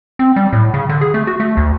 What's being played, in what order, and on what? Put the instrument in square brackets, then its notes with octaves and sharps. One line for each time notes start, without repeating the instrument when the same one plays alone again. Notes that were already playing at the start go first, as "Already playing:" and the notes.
[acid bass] C4
G3
A2
C#3
D3
G#4
A3
F#4
A3
D2